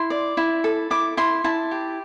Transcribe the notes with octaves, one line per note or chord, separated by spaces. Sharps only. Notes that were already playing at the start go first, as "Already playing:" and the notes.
Already playing: E4 C6
D5
E4
A4
E4 D6
E4 C6
E4 A5
G4